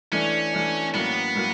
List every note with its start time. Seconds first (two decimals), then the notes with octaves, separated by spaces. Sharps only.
0.12 E3 A3 C#4 D4
0.53 E3 A3 D4
0.94 A2 F#3 A#3 B3 C#4
1.36 A2 F#3 A#3